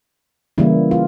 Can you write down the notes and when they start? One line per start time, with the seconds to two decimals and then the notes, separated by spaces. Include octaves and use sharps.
0.58 C#3 E3 G3 A#3 E4
0.91 F4